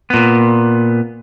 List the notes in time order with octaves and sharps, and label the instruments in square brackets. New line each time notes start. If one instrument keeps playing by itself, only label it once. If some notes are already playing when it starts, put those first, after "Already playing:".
[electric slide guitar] A#2 B3